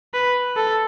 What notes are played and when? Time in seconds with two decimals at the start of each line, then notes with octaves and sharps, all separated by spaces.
0.14 B4
0.57 A4